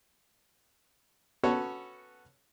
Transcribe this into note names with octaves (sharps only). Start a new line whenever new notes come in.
B3 C#4 F#4 A4 C#5